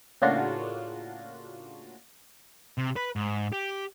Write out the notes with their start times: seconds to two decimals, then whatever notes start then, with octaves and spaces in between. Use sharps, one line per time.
0.22 A2 C#3 A#3 D4 F4 F#4
2.78 C3
2.96 B4
3.16 G#2
3.53 G4